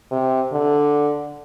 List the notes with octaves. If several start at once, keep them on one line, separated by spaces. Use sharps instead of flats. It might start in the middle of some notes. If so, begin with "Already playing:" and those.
C3
D3